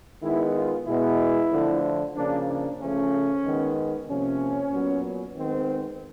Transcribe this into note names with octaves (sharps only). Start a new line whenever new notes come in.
D#3 G#3 B3 E4
F4
B2 G#3 B3 E4
D3 F3 A3
C#3 F3 A#3 D4
D4
C#3 F3 A3 C#4
D#3 G#3 B3
C3 F3 A#3 C#4
A#2 F#3 B3
D#3 G#3 B3 C4